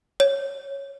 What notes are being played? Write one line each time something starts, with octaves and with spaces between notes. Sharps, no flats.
C#5